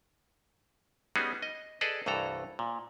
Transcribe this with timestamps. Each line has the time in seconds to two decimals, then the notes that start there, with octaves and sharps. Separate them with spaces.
1.16 G3 B3 C#4 D#4 F#4 G#4
1.42 D#5
1.81 G#4 A4 B4 D5 D#5
2.06 C2 G2 E3 A4 A#5
2.59 A#2